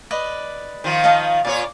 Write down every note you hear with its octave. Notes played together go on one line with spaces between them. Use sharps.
B4 D5 D#5
D#3 F3 F4
D#5 F5 A5
A#2 F4 C#5 D5